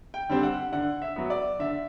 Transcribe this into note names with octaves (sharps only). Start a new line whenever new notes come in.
G5
D3 G3 C4
F#5
D3 F#5
E5
F#3 B3
D5
D3 E5